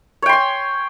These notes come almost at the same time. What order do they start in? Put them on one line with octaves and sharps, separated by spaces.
C#5 G5 C6 G#5